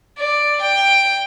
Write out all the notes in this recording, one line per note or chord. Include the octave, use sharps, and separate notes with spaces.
D5
G5